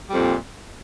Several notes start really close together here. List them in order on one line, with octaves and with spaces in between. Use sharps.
G3 F2 A#2